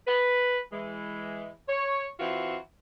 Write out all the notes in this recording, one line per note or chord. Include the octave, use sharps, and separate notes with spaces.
B4
E3 G#3
C#5
E3 C4 F4 F#4